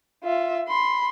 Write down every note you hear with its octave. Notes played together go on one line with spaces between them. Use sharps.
F4 E5
B5 C6